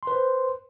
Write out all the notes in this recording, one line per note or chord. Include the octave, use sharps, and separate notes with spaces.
B4 C5 C6